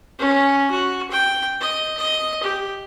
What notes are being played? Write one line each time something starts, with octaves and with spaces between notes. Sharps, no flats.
C#4
F#4
G5
D#5
D#5
G4